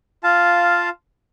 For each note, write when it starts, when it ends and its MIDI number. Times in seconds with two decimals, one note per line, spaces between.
0.23 0.89 65
0.23 0.89 77
0.23 0.89 81